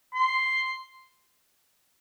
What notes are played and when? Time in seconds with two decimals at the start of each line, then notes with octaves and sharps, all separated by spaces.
0.15 C6